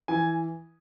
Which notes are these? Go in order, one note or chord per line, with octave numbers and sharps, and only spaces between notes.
E3 G#5